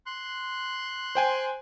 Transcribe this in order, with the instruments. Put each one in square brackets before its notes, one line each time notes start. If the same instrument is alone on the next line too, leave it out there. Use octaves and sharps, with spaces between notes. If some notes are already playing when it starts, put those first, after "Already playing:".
[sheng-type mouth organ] C6 F#6
[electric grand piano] C5 G5 G#5